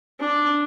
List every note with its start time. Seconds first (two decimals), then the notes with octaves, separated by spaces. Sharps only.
0.21 D4